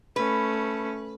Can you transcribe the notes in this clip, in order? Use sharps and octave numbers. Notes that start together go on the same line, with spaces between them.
A3 C#4 B4